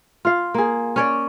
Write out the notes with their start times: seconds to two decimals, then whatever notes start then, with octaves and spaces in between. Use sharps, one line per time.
0.25 F4 F5
0.54 A#3 G#4
0.96 C#4 C#5 D5